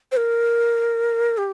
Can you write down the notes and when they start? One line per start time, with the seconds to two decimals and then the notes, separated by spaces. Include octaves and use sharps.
0.12 C5
0.17 A#4
1.38 G4